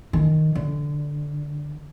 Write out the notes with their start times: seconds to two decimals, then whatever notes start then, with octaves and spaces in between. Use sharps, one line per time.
0.13 D#3
0.55 D3